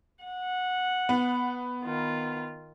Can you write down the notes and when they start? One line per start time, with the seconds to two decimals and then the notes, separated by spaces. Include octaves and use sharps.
0.24 F#5
1.09 B3
1.84 D#3 F4